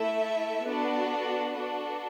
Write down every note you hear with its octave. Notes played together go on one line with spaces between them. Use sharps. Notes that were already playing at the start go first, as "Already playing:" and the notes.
Already playing: A3 E4 A4 E5
B3 D4 F#4 A4 B4
D4 F#4 A4